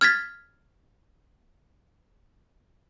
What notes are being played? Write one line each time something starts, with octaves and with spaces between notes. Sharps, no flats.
F6 G#6 A6 B6